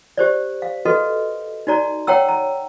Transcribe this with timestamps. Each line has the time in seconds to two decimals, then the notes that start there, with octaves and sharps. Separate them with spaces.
0.18 G4 C5 D5
0.62 F5
0.85 F#4 A4 B4 D#5
1.67 D#4 F#4 D5 A#5
2.07 C#5 F#5 G5 A#5 E6
2.28 A#5